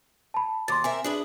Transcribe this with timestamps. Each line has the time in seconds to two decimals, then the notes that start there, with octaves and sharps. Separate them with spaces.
0.34 A5 B5
0.68 D#2 C6 D6 A6
0.84 C4 A#4 E5 G#5
1.04 D4 G#4 B4